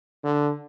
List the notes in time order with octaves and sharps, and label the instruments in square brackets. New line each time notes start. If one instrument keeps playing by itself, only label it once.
[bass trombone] D3